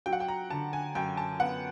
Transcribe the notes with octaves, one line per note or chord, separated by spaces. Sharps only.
F#3 G5
F#5
G5
A#5
D3 A5
G#5
F#2 G5
A5
B3 F#5